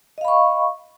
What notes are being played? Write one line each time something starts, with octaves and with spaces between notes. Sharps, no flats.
D#5 F5 B5 C#6